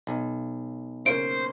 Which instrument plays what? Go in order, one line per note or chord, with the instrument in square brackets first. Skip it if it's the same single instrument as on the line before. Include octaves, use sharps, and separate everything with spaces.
[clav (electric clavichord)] B1
[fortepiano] C#3 A#3 [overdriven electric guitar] C5 [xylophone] D7